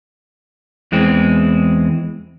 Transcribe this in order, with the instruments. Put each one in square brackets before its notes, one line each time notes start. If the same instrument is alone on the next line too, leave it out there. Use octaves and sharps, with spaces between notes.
[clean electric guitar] E2 E3 G#3 C4